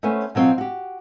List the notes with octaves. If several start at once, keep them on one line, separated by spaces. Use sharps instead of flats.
A3 B3 C#4 C5 G#5
B2 F#3 C4 F4
F#4 G4